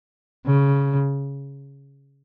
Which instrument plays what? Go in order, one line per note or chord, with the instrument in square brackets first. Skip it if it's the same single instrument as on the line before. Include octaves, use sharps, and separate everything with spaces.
[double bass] C#3